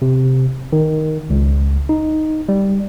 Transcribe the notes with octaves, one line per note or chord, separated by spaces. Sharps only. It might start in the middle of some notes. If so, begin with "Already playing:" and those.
C3
D#3
C#2
D#4
G3